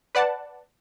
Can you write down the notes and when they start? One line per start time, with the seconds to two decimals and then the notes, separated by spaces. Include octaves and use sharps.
0.15 B4 D5 F#5 A5